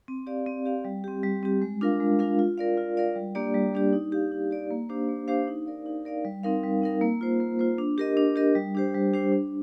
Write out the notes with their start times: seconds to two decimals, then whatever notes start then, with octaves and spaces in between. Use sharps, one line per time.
0.08 C4
0.27 G4 D5 F5
0.46 C4
0.65 G4 D5 F5
0.85 G3
1.04 C4 G4
1.23 G3
1.43 C4 G4
1.62 G#3
1.81 D4 F4 A#4 F5
2.00 G#3
2.19 D4 F4 A#4 F5
2.39 F4
2.58 A#4 D5 F5
2.77 F4
2.97 A#4 D5 F5
3.16 G3
3.35 A#3 D4 G4 D5
3.54 G3
3.73 A#3 D4 G4 D5
3.93 D#4
4.12 G4 D5 F5
4.32 D#4
4.51 G4 D5 F5
4.71 A#3
4.89 D4 G4 C5 F5
5.09 A#3
5.28 D4 G4 C5 F5
5.47 D#4
5.66 A#4 D5 F5
5.86 D#4
6.05 A#4 D5 F5
6.25 G3
6.43 C4 D#4 A#4 F5
6.63 G3
6.82 C4 D#4 A#4 F5
7.01 A#3
7.21 F4 C5
7.40 A#3
7.59 F4 C5
7.78 D4
7.98 G4 A#4 D#5
8.17 D4
8.36 G4 A#4 D#5
8.55 G3
8.75 D4 G4 C5
8.94 G3
9.14 D4 G4 C5
9.32 D4